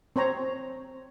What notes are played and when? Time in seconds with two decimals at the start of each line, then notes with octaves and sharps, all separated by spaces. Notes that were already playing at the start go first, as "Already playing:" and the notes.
0.16 C4 C5 C#5 A#5